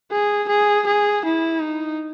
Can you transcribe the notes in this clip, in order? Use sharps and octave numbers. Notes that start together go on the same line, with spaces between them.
G#4
G#4
G#4
E4
D#4